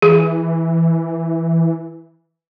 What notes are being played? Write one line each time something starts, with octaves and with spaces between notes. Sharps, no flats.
E3 G#4